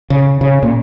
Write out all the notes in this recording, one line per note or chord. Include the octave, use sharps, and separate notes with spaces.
C#3
C#3
A#2